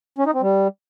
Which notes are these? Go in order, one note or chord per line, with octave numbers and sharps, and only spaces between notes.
C#4
D#4
C4
G3